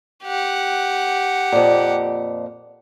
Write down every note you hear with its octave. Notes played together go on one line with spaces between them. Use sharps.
G4 F#5
F2 A#2